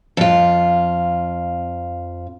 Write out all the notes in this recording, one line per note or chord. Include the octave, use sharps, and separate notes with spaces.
F2 F4